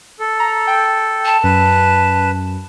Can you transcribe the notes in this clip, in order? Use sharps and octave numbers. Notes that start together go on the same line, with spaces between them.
A4
A#5
G5
A5
F#2 B4